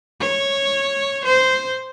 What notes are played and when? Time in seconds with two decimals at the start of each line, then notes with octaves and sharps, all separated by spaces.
0.20 C#5
1.25 C5